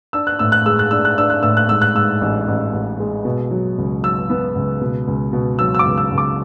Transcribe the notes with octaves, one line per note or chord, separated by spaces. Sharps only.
D4 E6
F#6
A2 E6
F#6
G#3 E6
F#6
D4 E6
F#6
D4 E6
F#6
A2 E6
F#6
G#2 E6
F#6
G#2 E6
A1
A1
A1
G#3
B2
F#3
C#2
F#3 E6
B3
C#2
B2
C#2
B2
F#3 E6
E6
D6
C#2
E6
C#2
D6